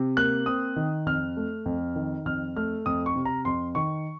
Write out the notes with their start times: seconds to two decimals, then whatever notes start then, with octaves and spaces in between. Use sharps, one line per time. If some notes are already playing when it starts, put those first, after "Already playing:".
Already playing: C3
0.17 A#3 F#6
0.46 C4 D#6
0.76 D#3
1.06 F2 F6
1.37 A3
1.66 F2
1.96 D#3
2.26 F2 F6
2.56 A3 F6
2.86 F2 D#6
3.06 C#6
3.16 C3
3.25 A#5
3.45 F2 C6
3.75 D#3 C#6